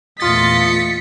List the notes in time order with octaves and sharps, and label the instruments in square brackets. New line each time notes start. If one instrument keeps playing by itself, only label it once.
[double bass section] E2 A#2 A3 [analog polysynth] F4 A6 [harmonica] D#5 [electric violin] B6 C#7